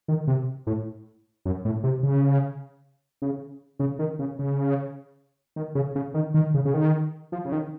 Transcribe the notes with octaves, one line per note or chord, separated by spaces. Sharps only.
D#3
C3
A2
F#2
A2
C3
C#3
C#3
C#3
D#3
C#3
C#3
D#3
C#3
C#3
D#3
D#3
C#3
C#3
D#3
F3
C#3
D#3